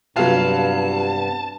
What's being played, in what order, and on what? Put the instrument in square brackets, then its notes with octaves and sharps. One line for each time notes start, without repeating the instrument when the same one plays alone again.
[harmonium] G2 [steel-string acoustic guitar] C3 B3 [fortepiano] F#3 F4 [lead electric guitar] A5